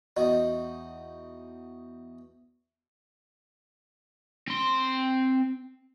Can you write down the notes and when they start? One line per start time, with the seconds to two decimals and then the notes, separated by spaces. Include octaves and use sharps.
0.17 E2 D#4 F#4 D#5
4.48 C4 C6